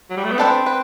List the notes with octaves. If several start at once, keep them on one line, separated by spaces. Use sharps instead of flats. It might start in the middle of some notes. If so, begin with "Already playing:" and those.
F#3
G3
A3
B3
E3 A3 C4 D4 A4 C5
B4